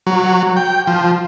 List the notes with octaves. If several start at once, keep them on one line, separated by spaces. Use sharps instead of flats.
F#3
G5
F3